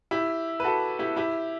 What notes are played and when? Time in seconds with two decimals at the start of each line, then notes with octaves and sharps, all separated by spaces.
0.11 E4 G4
0.60 B4
0.64 F#4 A4
0.99 E4 G4
1.16 E4 G4